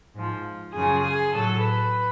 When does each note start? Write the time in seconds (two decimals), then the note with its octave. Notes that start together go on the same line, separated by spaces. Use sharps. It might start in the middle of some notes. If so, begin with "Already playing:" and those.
0.15 G#2 F3
0.74 F#2 C#3 F3 G#4
1.04 G#4
1.33 A2 F#3 A4
1.63 B4